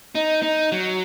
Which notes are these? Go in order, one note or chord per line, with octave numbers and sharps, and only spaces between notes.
D#4
D#4
F#3